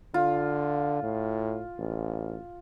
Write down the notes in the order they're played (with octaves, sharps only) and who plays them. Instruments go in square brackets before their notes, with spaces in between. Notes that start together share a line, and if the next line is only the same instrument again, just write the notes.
[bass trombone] D3 [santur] F4
[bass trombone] A2
A1